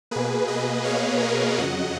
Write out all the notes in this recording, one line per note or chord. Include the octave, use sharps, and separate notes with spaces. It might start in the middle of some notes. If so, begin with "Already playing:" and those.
B2 A#3 G#4 B4
B4 D#5
C#5 F5
A#4 C#5
F2 C#3 F#3 D#5 F#5